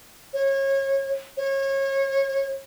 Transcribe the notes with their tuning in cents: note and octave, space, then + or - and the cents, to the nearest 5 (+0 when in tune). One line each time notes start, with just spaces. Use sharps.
C#5 -30
C#5 -30